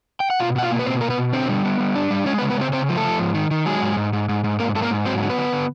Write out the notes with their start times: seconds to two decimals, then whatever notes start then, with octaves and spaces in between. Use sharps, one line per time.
0.20 G5
0.30 F#5
0.40 B2 F4 F5
0.56 B2 F#5
0.63 F4 F5
0.71 A#3
0.79 B4
0.86 B2 C4 C5
1.01 A#3 A#4
1.10 B3 B4
1.18 B2
1.33 D3 C4 C5
1.49 G3
1.65 B3
1.80 G3
1.95 D4
2.11 G3
2.26 G#3 C#4 C#5
2.38 B3 B4
2.42 C#3
2.50 B3 B4
2.58 C#3 C4 C5
2.73 C#3 C4 C5
2.89 F3
2.97 A3 A4
3.04 F3
3.20 G#2
3.35 D#3
3.51 D#3
3.66 F#3 G#3 G#4
3.82 G#2
3.97 G#2
4.13 G#2
4.29 G#2
4.44 G#2
4.59 G#2 A#3 A#4
4.75 G#2 A4
4.82 A#3 A#4
4.91 G#2
5.06 F#3 C4 C5
5.22 D3
5.29 B3 B4
5.37 D3
5.52 D3